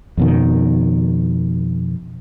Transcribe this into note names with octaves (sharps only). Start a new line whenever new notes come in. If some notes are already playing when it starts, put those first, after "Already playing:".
F2 B2 D#3